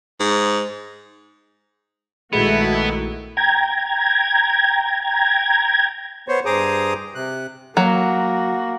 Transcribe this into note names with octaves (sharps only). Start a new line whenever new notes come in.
G#2
A#1 D#3 G#3 A3 B3 E4 F#4
G5 A#5 G#6
B3 C5 C#5
G2 G#4 C5 A#5 D6 D#6
C3 F#6
F#3 A#3 F#4